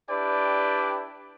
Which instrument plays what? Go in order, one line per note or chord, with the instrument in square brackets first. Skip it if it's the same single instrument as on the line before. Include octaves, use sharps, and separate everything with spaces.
[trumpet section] D4 E4 G4 B4 D5 G5